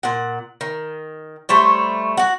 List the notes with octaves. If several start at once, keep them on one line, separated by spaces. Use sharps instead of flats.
A#2 F#5
D#3
G3 A3 C5 C#5
F#4 F#5